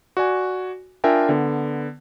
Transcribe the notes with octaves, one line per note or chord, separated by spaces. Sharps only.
F#4 D5 G#5
D4 F4 A#4 E5 G5 G#5
D3 B3